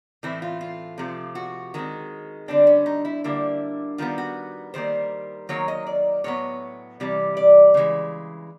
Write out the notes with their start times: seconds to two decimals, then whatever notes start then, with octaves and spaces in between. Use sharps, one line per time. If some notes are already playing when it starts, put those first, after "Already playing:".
0.23 A2 E3 A3 C4 E4
0.42 F4
0.61 F4
0.98 C3 F3 A3
1.35 F#4
1.74 D#3 G#3 C4
2.48 D3 G3 C4 D4
2.67 C#4
2.86 D#4
3.05 E4
3.24 D3 G3 A#3 E4
3.98 D#3 G3 B3 F4
4.18 F#4
4.74 D#3 G3 A#3 C5
5.49 D#3 F#3 A#3 C#5
5.68 D#5
5.87 D5
6.24 A2 F#3 B3 C#5
7.00 C3 E3 G3
7.37 D5
7.74 C#3 E3 G#3